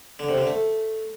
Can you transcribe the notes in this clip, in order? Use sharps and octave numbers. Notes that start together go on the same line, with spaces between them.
D3
C3
D3
A3